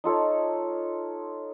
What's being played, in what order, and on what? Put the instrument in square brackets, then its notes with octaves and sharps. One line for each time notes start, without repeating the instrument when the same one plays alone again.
[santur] D#4 F4 A4 C#5